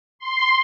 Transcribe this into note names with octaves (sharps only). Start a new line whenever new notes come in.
C6